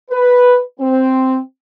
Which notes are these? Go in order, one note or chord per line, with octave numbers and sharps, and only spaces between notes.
B4
C4